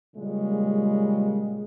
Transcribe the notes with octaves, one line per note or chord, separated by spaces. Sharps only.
A#2 C#3 G3 G#3